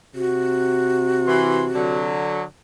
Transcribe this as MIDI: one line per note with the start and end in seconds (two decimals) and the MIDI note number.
0.15 2.22 48
0.15 1.94 66
1.27 1.65 52
1.27 1.65 84
1.75 2.43 50
1.75 2.43 54